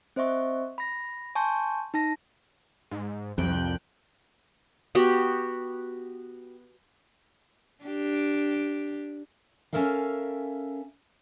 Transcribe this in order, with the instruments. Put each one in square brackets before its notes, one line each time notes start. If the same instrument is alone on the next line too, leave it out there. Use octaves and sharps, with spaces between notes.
[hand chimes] C4 C5 D#5 E5 C#6
B5 A#6
G#5 A5 C6 C#6 G6
D#4 A5 A#6
[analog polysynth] G#2
[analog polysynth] C2 G5 F#6 [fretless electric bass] F2 [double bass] F3
[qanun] B3 F#4 G4 G5
[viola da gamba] D4 G4
[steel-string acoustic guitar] C#4 D4 A4 A#4 E5 F5